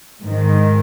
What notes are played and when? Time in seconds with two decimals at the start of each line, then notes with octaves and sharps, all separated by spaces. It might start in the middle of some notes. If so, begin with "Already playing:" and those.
0.22 G#2 D#3